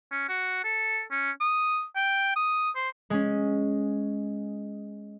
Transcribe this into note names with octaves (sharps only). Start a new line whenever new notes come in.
C#4
F#4
A4
C#4
D#6
G5
D#6
C5
G#3 C#4